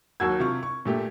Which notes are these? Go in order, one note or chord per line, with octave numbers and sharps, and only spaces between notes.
D#2 F#3 F#4 E6 G#6
C3 F4 C#6
C#6
A#2 A3 G4